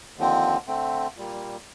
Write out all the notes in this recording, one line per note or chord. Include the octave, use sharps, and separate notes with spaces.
D#2 D3 F3 C4
D3 A3 C4
A#2 G3 A#3